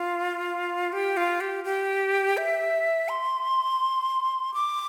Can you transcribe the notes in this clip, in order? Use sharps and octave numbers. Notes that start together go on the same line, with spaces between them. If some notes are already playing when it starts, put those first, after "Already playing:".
Already playing: F4
G4
F4
G4
G4
E5
C6
D6